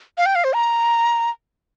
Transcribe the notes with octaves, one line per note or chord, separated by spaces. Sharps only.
F5
G5
F5
C5
A#5